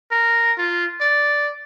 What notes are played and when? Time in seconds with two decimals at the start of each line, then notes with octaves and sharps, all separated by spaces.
0.11 A#4
0.58 F4
1.01 D5